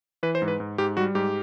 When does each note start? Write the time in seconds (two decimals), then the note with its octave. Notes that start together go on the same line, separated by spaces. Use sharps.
0.23 E3 B4
0.35 C5
0.42 G#2
0.48 B4
0.60 G#2
0.78 G#2 G4
0.97 G3 F#4
1.15 G#2 G4